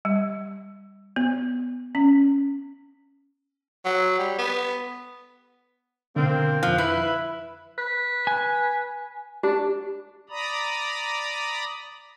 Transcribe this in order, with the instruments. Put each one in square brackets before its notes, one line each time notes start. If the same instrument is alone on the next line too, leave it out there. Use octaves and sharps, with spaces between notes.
[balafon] G3
B3
C#4
[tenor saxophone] F#3
G3
B3
[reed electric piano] B2 D3 [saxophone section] A#3 C4
[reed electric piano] F2 F#6 [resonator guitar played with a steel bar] F3
[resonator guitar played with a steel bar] E4 [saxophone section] B4 E5
[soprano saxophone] B4
[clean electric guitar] G#5
[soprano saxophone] D4 [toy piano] G4
[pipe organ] D5 A#5 B5 D#6